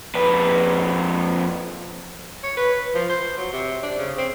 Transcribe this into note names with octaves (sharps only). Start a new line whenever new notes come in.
F2 B4
C#5
B4
F3
C5
F#3
C3
D4
C#3
C4